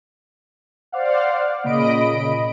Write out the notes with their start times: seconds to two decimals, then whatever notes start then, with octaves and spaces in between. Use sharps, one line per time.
0.92 C5 D5 F5 F#5
1.64 A#2 C#3 D#5 B5 D7